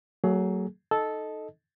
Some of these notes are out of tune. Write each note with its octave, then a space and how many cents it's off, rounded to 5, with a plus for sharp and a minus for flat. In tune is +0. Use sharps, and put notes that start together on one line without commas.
F#3 +15 A#3 -45 G#4 +20
D#4 +0 A4 -10 D#5 +0